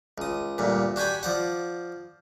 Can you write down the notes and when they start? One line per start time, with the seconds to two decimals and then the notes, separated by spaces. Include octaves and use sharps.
0.18 C#2 D#6
0.58 D2 G2 A#2
0.96 D4 F#4 G4 G#5 B5
1.23 F3 D5 F#5